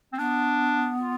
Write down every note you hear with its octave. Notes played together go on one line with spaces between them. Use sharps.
A3 C4
B3 D4
F4